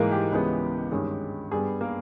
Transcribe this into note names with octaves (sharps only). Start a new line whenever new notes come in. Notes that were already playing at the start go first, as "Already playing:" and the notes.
Already playing: G#2 E3 G#3 A#3 G#4 A#4
G4
C#2 C#3 E3 G#3 B3
G2 D#3 G#3 C#4
G2 G3 B3 G#4
A#3 A#4